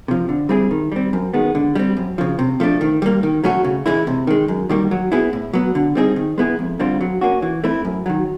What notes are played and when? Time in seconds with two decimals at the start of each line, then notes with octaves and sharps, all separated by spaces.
0.08 C3 F3
0.29 D3
0.49 G3 C4 E4 G#4
0.71 D#3
0.92 G3 C4
1.13 F#2
1.34 D#3 G#3 B3
1.55 D3
1.75 G3 C4
1.97 F#2
2.18 C#3 F3
2.39 C3
2.60 F3 A3 D4
2.81 D#3
3.02 G3 A#3
3.23 D#3
3.44 F#3 A3 C#4 F#4
3.64 C#3
3.86 E3 G#3 C#4 E4
4.07 C3
4.27 D#3 G#3
4.48 F#2
4.69 D#3 G3 A#3
4.91 F#3
5.12 B3 E4 G#4
5.33 A2
5.53 F#3 B3
5.75 D3
5.95 G3 C4 D#4 G#4
6.16 D#3
6.38 G#3 B3 E4 G#4
6.59 F2
6.80 D3 G3 C4 F4
7.01 F#3
7.21 A#3 C#4 F#4
7.42 E3
7.64 A3 C4 E4
7.85 F#2
8.06 D#3 F#3